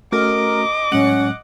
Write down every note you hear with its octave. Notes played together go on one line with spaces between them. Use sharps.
A3 C#4 F#4 A#4 D#5 D6
A2 F#3 G#3 C#4 F#5